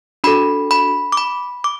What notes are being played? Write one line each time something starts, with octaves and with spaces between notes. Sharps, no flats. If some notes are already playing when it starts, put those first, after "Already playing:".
D4 F#4 A4 B5
B5
D6
B5
D6